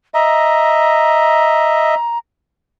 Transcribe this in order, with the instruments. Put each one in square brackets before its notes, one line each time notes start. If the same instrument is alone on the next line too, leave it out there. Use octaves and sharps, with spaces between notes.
[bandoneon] D#5 E5 [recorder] A#5